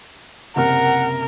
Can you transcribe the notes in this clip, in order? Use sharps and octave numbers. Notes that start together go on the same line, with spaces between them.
F#1 C3 A#4 F#5 F6